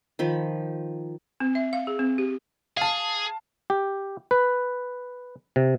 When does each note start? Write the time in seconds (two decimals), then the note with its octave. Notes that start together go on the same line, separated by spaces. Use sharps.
0.19 D#3 F3 B5
1.40 C4
1.55 E5
1.73 F5
1.87 G#4
1.99 C4
2.18 G4
2.77 G#4 F5 A5
3.70 G4
4.31 B4
5.56 C3